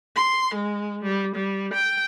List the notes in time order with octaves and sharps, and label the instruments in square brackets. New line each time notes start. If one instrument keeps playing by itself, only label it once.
[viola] C6
G#3
G3
G3
G5